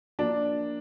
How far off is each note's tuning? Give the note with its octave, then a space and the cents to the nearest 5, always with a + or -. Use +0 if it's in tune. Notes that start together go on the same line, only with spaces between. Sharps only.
F3 +0 A#3 +0 D4 +0